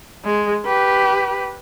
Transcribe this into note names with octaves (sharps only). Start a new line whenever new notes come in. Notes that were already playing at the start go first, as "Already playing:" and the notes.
G#3
G4 B4